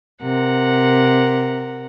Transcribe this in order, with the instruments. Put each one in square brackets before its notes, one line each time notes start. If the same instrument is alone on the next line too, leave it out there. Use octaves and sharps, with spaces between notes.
[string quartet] C3 A#4 F#5